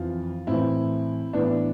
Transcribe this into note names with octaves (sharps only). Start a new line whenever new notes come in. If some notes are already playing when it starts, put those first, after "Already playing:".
Already playing: F2 E3 F4
A2 E3 C4 E4
A2 E3 B3 D4